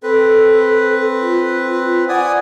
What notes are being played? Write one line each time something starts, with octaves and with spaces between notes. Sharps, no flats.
C4 A4 B4
F4
D5 F#5 G#5 D#6